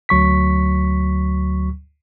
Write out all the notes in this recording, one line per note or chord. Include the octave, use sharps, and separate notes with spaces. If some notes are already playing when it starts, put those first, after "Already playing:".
D2 F#3 C#6 B6